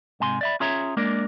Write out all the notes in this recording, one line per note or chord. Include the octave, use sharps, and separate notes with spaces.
G#2 C3 G#5 C6
D5 E5 B5
C#4 F4 G#4 C#5 E5 A#5
G#3 A#3 D4 A#4 D5